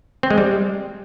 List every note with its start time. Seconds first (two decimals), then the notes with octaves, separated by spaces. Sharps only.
0.23 C4
0.30 G#3
0.38 G3